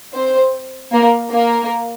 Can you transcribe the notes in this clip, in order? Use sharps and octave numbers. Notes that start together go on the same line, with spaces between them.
C4 C5
A#3 A#4
A#3 A#4